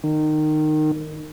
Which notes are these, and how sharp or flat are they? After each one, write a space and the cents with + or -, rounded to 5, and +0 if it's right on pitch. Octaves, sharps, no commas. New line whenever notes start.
D#3 -20